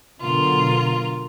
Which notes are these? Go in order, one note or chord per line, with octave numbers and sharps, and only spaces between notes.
B2 D3 F#3 F4 A#4